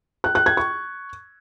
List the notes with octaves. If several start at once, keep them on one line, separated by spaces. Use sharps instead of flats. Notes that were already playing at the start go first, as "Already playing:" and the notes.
F#6
F#6
G#6
C#6